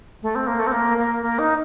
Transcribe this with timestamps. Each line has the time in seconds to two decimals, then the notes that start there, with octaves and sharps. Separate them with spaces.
0.22 A3
0.35 C4
0.47 A#3
0.59 A3
0.67 C4
0.72 A#3
0.98 A#3
1.22 A#3
1.39 D#4